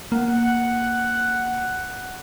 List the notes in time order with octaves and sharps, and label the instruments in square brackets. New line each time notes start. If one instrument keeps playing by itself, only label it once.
[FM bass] A#3 [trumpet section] F#5